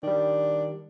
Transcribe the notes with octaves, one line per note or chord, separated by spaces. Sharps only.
D#3 G3 D4